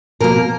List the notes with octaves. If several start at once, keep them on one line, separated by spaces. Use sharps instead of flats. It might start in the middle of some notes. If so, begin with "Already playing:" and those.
B2 A#3 A#4